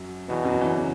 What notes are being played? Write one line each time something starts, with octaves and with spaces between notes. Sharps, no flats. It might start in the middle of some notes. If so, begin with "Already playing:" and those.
Already playing: F#2 F#3
E2 B2 E3
F#2 F#3
E2 E3
C#3